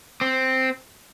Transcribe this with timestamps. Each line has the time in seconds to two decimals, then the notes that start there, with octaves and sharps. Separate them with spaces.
0.21 C4